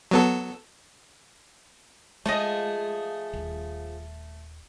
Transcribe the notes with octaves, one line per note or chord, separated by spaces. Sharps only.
F#3 B3 A4
F3 G#3 A3 G#4 D#5
D#1